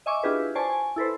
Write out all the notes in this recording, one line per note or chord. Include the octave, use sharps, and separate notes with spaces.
D#5 E5 G#5 C#6 D6
D4 E4 F4 G4 G#4 B4
C5 D5 G#5 A5 C#6
G#5
E4 A4 B4 C5